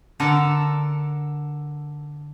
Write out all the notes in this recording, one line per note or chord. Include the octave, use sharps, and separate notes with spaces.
D3 A4 A#4 A5